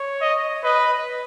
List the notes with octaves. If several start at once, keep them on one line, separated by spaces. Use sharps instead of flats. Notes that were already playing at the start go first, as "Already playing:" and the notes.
Already playing: C#5
D#5
B4 D#5